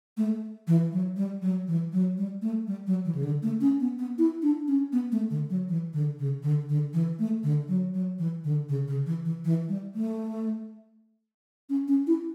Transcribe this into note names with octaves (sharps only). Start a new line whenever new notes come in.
A3
E3
F#3
G3
F#3
E3
F#3
G3
A3
G3
F#3
E3
C#3
D3
A3
C#4
B3
B3
E4
D4
C#4
B3
A3
D3
F#3
E3
D3
C#3
D3
D3
E3
A3
D3
F#3
F#3
E3
D3
C#3
C#3
E3
E3
E3
G3
A3
C#4
C#4
E4